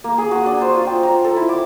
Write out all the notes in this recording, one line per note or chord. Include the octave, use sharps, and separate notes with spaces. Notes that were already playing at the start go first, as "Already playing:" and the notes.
A#3
G#4
F#4
D4
C5
F4
G5
A#5
A4
E4
D6